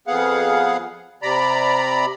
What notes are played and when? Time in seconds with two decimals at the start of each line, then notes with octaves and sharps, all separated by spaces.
0.07 F2 B3 G#4 F5 F#5
1.22 C3 D5 A#5 B5